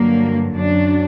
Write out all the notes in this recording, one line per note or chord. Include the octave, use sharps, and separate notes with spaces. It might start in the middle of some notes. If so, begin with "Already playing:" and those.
Already playing: G2 D3 F#3 A#3
F#2 F#3 D4